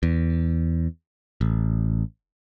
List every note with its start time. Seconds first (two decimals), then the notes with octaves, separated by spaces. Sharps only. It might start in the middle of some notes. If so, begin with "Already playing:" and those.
0.03 E2
1.41 A1